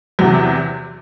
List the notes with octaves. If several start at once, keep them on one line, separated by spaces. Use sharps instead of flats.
E2 C3 F#3